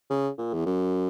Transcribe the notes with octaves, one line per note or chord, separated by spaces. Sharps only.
C#3
A#2
E2
F#2